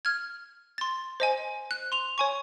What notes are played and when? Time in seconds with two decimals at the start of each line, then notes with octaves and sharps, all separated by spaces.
0.05 F6 G#6
0.78 C6 A6
1.20 C5 D#5 G#5
1.71 F#6
1.92 C6 F7
2.18 C#5 G#5 C#6